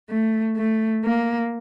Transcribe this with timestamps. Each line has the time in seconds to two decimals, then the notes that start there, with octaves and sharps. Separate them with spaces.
0.09 A3
0.55 A3
1.04 A#3